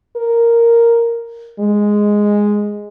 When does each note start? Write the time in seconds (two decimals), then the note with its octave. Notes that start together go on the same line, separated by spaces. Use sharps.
0.16 A#4
1.60 G#3